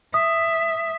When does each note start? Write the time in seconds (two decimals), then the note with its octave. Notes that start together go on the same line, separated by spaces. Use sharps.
0.14 E5 D#6